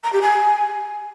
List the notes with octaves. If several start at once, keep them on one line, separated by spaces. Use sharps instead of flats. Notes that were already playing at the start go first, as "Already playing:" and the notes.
A#5
G4
G#5